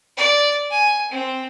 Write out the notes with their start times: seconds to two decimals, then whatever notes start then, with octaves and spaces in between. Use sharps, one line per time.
0.17 D5
0.70 G#5
1.11 C4